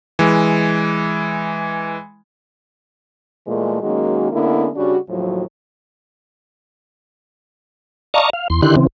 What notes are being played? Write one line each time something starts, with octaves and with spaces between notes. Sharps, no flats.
E3 G#3
A#2 E3 G#3 A3
D#3 F#3 G#3 A#3 C#4 F#4
D3 G#3 A#3 B3 C#4 E4
C#3 G3 D4 F#4
D#2 A2 F3 F#3
D5 D#5 F5 A5 A#5 C#6
F5
E2 C6
D3 D#3 E4 G4 C6 F#6
C#3 E3 C4